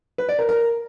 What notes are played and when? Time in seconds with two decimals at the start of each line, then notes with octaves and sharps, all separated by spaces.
0.18 B4
0.29 D5
0.39 A#4
0.49 A#4